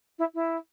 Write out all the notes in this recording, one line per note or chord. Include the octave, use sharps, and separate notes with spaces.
E4
E4